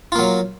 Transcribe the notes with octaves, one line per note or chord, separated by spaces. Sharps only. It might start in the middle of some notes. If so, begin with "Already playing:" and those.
F#3 A#3 F4